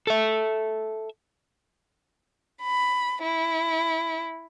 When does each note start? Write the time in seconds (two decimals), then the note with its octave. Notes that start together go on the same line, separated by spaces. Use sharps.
0.07 A4 E5
2.63 B5
3.23 E4